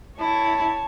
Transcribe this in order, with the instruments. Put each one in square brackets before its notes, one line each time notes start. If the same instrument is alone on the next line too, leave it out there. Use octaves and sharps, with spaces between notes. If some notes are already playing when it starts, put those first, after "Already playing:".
[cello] E4 [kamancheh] C#5 A5